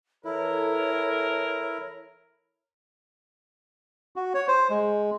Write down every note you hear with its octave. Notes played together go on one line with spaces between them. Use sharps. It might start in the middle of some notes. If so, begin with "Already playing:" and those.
E3 E4 A4 A#4 C#5
F#4
C#5
C5
G#3